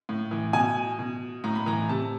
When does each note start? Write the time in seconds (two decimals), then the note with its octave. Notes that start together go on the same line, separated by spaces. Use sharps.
0.09 A2
0.31 E3
0.53 B2 G#5
0.99 B2
1.44 A2 A#5
1.55 B5
1.66 E3 A#5
1.89 C3 A5